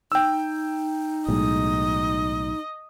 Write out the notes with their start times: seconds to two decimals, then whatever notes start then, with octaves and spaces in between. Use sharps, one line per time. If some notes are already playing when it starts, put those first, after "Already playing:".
0.12 D#4 G5 E6
1.28 B1 A2 G#3 D#5